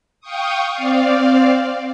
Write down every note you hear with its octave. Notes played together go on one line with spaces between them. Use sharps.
F5 G5 C#6 D#6
C4 D5 F5